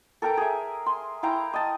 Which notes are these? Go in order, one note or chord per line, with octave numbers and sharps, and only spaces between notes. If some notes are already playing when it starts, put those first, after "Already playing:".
A4 A#4 G5 A#5
G#4 E5
C6
E4 F5 G5 A#5
D#5 A5